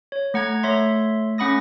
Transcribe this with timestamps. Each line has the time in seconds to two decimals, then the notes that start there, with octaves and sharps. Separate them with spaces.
0.12 C#5
0.34 A3 F#5 A#5 G#6
0.63 A3 C#5 E5 C6
1.38 A3 C#4 F#5 B5 D#6 A#6